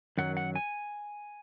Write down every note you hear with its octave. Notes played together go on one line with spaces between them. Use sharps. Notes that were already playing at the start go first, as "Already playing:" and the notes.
F#2 D#3 F#3 F#5
F#5
G#5